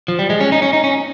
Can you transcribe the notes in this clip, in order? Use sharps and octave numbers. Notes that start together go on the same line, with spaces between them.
F3
G3
G#3
C#4
D#4
C#4
D#4
C#4